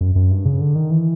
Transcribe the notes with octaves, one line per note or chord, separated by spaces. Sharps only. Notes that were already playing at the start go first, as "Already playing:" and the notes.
F#2
F#2
G2
C#3
D3
D#3
E3